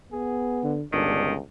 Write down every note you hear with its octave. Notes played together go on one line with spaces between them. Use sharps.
B3 G#4
D3
G1 C#2 D#3 D4